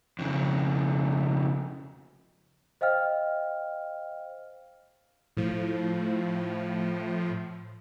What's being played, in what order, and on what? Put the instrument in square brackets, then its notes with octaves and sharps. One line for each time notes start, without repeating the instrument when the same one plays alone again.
[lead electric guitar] F2 C#3
[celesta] C5 D#5 F5 G5 F6
[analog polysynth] A2 F3